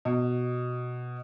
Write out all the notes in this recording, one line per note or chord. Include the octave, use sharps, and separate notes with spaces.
B2